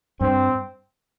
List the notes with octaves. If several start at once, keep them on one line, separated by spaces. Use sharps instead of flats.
G2 C4